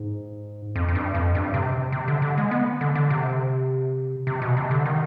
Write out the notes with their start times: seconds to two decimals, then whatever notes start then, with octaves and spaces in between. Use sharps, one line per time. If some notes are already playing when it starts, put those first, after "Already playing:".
Already playing: G#2
0.76 F2
0.89 F2
0.95 G2
1.14 F2
1.35 G2
1.54 C3
1.92 C3
2.08 D3
2.22 D3
2.38 G#3
2.51 B3
2.81 D3
2.95 D3
3.10 C3
4.27 C3
4.42 B2
4.57 C3
4.71 D3
4.86 D#3